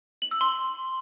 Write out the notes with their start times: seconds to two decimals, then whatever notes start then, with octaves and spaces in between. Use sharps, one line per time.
0.22 F#7
0.31 E6
0.41 C6